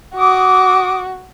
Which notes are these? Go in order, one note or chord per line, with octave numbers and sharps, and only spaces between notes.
F#4 D6 D#6